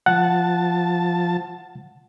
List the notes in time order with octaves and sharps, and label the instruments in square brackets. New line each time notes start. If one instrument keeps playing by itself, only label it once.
[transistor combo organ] F3 A5 [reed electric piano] F#5